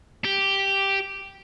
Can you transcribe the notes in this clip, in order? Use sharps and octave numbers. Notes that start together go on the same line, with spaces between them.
G4